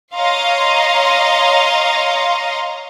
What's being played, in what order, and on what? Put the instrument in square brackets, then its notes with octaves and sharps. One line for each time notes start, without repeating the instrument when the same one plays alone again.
[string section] C#5 D#5 F5 A#5 C6